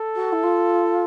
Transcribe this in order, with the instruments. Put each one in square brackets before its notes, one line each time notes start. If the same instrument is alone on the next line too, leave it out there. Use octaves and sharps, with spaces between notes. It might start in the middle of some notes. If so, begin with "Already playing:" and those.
Already playing: [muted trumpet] A4
[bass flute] F#4
E4
F4